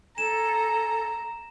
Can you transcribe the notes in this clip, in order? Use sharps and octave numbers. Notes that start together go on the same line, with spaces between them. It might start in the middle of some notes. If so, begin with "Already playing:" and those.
A4 G#5 A#5 E7